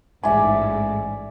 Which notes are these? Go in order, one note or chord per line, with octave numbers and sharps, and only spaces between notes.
A1 G#2 D5 E5 G#5